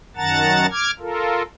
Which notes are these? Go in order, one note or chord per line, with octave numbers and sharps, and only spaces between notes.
F#2 D#3 F#5 A5 A#5 A6
D6 F6 G#6
F4 A4 A#4